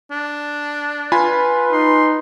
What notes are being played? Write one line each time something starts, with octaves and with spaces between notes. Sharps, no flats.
D4
F4 B4 G#5 B5
D#4 C6